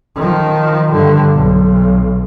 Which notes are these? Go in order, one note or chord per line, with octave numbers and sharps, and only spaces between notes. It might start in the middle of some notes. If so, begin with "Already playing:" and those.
D#3 F3
G2 D3
B1